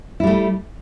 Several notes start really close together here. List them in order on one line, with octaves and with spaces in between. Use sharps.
E4 G3 A3